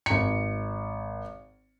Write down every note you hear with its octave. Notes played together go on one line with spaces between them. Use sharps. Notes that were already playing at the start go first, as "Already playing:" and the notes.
G#1 C#7